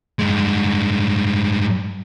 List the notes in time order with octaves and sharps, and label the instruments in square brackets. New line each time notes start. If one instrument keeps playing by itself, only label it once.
[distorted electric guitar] G2 G#3